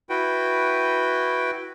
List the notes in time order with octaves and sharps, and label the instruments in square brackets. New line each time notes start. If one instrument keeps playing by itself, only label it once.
[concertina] E4 F#4 B4 G5